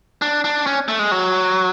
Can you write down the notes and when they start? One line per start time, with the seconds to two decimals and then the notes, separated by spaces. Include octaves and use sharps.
0.22 D4
0.44 D4
0.66 C#4
0.88 A3
0.99 G#3
1.12 F#3